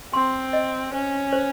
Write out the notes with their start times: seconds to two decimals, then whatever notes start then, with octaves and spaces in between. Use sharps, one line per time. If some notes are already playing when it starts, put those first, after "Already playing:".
0.13 C4 C6
0.53 D#5
0.92 C#4 C5
1.33 C5